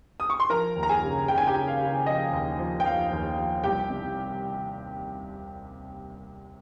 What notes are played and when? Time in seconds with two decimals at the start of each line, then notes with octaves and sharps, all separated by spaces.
0.20 D#6
0.30 C#6
0.40 C6
0.50 F3 A#4 A#5
0.76 D#2
0.83 A#5
0.89 G#4 G#5
1.02 C#3
1.28 C#3 G5
1.38 G#5
1.47 G4 G5
1.55 C#3
1.68 F5
1.81 C#3
2.06 F3 D#5
2.33 D#2
2.59 F3
2.80 G5
2.85 F3 F5
3.11 D#2
3.38 F3
3.64 C2 G4 G5
3.90 C3